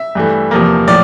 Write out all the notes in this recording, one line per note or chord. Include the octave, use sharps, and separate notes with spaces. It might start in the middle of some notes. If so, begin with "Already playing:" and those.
Already playing: E5
G2 E3 A3
E2 C3 F3 A#3
A2 F3 D5